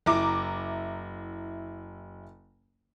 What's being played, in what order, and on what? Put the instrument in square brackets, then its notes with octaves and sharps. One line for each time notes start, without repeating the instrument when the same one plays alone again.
[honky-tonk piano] F#1 E4 A#5 D6